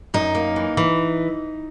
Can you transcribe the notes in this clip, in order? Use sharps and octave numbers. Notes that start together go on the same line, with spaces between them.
F#2 D#4
A#3
E3
E3